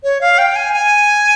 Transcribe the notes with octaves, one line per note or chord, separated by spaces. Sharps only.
C#5
F5
G5
G#5
G#5